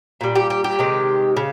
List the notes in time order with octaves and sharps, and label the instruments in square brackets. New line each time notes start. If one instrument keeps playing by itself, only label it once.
[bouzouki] A#2 G3
G4
G4
G4
C3 D#3 G#3
C#3